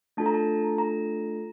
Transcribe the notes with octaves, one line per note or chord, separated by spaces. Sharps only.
A3 D4 F4 A4 A5
A#5
A5
A#5